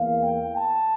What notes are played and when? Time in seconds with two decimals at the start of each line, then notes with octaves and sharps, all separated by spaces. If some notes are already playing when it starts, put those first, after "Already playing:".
Already playing: E2 E3 A#3 F5
0.24 G5
0.57 A5